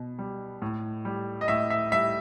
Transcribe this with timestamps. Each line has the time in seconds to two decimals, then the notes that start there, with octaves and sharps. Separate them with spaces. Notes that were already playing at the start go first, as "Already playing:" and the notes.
Already playing: B2
0.19 G3
0.62 A2
1.05 G3
1.41 D#5
1.48 A2 E5
1.70 E5
1.92 G3 E5